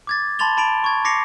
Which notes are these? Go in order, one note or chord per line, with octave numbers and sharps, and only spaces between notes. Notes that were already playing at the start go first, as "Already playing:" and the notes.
D6 G#6 A6
A5 B5 C6 A6 F7 G7
A5 B5 D7 F7
C#6 G#6
D6 A#6 C7 C#7 F7